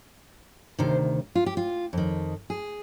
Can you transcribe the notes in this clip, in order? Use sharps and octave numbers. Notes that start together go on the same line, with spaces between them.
D2 C3 D#3 C5
F4
G4
F4
F2 D#3
G#4